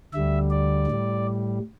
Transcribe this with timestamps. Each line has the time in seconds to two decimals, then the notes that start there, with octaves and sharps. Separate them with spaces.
0.13 D2 D3 G3 E5
0.50 D5
0.87 A2 G3